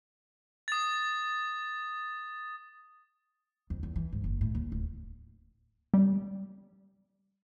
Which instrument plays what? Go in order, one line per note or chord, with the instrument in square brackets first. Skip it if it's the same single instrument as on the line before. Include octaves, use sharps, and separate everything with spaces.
[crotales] D#6 A6
[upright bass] F2
E2
E3
G#2
F#1
A2
D#2
D1
[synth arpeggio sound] G3